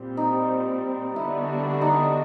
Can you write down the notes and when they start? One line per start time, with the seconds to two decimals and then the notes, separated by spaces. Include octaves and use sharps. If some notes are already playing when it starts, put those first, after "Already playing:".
Already playing: A#2 G3 C4
0.17 D#4
1.16 D3 G3 B3 D4 E4 F#4
1.81 D#4